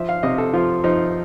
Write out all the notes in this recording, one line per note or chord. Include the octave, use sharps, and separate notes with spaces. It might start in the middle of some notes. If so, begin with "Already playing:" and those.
Already playing: F3 E5
F5
C3 D#5
A4
F3 F4
F3 D#4